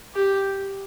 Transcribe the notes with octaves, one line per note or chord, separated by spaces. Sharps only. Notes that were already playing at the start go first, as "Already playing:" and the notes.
G4